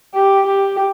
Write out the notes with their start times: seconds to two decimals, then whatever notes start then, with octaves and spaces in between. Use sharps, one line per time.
0.15 G4
0.47 G4